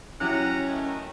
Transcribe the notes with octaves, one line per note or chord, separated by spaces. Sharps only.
F#3 C#4 E4 G4 F#5 A#5
D#3 A3